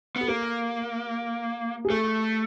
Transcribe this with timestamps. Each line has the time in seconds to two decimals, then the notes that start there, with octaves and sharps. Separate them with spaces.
0.16 B3
0.21 A4
0.28 A#3 A#4
1.85 G#4
1.90 A3 A4